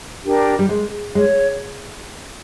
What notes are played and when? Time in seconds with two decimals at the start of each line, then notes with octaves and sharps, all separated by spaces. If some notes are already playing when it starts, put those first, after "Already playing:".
0.25 D4 G4 A#4
0.59 G3
0.69 G#3
1.15 G#3 C#5